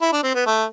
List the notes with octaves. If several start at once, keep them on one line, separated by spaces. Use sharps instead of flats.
E4
D4
C4
B3
A3